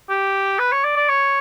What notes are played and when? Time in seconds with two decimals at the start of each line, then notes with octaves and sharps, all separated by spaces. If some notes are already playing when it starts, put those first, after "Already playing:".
0.09 G4
0.59 B4
0.72 C#5
0.84 D5
0.96 D5
1.09 C#5